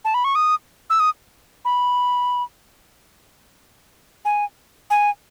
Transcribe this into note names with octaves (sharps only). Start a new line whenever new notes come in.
A5
B5
C#6
D#6
E6
D#6
B5
G#5
G#5